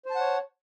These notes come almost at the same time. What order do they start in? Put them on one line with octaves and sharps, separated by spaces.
C5 A5 F#5 C#5